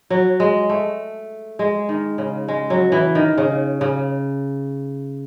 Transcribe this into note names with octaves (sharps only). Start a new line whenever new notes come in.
F#3
G#3
A3
G#3
D#3
C#3
G#3
F#3
E3
D#3
C#3
C#3